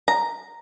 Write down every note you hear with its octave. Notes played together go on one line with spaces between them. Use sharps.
A#5